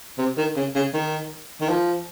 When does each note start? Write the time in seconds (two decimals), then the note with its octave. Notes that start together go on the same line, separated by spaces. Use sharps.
0.18 C3
0.37 D#3
0.56 C#3
0.75 C#3
0.94 D#3
1.61 D#3
1.69 F3